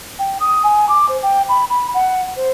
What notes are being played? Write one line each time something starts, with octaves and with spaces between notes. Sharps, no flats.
G5
D#6
G#5
D6
C5
G5
B5
B5
F#5
C5